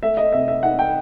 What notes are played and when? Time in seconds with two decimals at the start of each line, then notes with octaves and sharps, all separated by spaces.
0.03 A3 E5
0.17 D#5
0.33 C3 E5
0.48 E5
0.63 D#4 F#5
0.79 G5